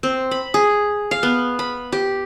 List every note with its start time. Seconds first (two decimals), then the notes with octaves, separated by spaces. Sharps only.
0.03 C4
0.31 B5
0.54 G#4
1.11 F5
1.23 B3
1.59 B5
1.92 G4